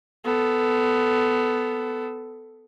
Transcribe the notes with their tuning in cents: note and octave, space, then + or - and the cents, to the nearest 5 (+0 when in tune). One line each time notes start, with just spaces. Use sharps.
B3 +15 A4 +0